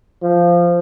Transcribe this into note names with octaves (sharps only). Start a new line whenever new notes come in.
F3